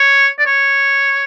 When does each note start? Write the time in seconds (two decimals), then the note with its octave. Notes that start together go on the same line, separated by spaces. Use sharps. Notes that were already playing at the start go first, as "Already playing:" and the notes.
Already playing: C#5
0.38 D5
0.46 C#5